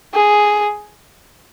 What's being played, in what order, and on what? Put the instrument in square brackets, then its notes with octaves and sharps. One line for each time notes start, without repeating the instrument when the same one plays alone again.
[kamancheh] G#4